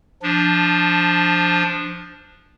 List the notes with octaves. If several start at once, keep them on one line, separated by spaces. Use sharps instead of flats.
F3 D4